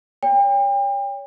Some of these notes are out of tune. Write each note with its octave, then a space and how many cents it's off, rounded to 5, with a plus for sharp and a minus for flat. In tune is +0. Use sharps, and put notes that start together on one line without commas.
C#5 +30 G5 +35